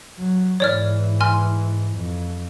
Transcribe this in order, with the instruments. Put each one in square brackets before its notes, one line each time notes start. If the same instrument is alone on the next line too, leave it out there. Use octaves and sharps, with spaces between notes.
[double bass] F#3
[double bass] G#2 E3 [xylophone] C#5 D5 F6
[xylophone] G#5 C6 F6
[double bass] F2